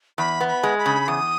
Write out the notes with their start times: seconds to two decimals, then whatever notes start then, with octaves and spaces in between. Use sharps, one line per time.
0.18 E2 B5
0.40 B3
0.48 B5
0.63 G#3
0.78 B5
0.86 C#3
1.08 E2 D#6